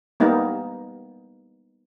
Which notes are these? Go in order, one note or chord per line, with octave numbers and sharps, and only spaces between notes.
G3 A#3 B3 D#4